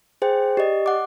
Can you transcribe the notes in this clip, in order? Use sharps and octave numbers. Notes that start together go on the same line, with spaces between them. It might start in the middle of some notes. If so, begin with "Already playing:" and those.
G#4 C5 G5
G4 D5 D#5
F#5 D6